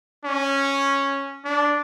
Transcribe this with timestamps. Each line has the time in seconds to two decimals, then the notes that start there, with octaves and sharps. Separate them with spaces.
0.24 C#4
1.45 D4